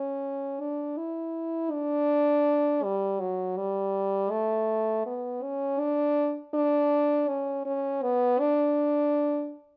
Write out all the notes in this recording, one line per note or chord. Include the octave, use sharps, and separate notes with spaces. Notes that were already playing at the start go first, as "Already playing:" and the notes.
Already playing: C#4
D4
E4
D4
G3
F#3
G3
A3
B3
C#4
D4
D4
C#4
C#4
B3
D4